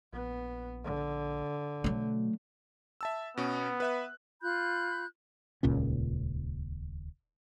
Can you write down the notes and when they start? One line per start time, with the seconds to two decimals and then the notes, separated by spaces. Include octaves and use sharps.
0.13 A#1 B3
0.84 D3
1.84 B2 F#3 A3
3.01 E5 A5 E6
3.37 B2 B3 C#4
3.80 B4 E5 F#6
4.41 F4 B5 F#6 G6
5.63 D#1 C#2 A#2 C#4